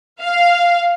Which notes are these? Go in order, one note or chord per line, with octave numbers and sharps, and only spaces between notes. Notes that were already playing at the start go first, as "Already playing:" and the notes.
F5